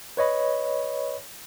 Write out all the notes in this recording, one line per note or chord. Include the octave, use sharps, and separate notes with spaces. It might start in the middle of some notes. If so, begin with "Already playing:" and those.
B4 C#5 D#5 B5